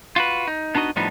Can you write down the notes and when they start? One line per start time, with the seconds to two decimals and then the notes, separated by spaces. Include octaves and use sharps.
0.16 F4 F#4 B4
0.47 D#4
0.75 B3 D4 D#4 F#4 D#5
0.96 A2 F3 G3 B3 D4 D#4